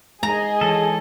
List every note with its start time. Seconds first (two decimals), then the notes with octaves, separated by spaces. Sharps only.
0.23 G#3 D#4 G#4 D#5 A#5
0.61 E3 G#3 A4 C#5